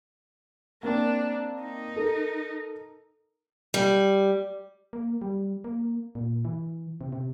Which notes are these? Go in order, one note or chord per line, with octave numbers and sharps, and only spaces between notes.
A#3 C4 D4
D#4
A4 A#4
G3
A#3
G3
A#3
A#2
E3
C3
C3